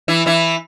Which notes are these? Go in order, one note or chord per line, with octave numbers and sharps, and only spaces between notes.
E3 E4
E3 E4